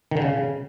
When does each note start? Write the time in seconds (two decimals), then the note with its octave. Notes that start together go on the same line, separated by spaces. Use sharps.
0.11 D#3
0.17 D3
0.22 C#3